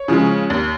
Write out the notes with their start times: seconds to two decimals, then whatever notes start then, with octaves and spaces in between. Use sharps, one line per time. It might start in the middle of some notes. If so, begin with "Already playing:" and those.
Already playing: C#5
0.08 C#3 F3 G#3
0.50 D#2